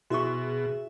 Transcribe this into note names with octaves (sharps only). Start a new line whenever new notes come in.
B2 E4 F#4 G#4 E5 C#6